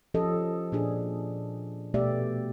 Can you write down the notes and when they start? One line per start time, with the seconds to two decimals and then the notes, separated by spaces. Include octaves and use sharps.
0.14 F3 C#4 G4 A4 D#5
0.72 A#2 D4 G#4
1.94 B2 A3 B3 G4 D5 E5